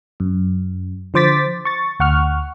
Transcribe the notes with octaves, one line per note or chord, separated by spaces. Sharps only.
F#2
D3 F3 C5 D6 A6 B6
C#6 A6
D2 F#5 C#6 F6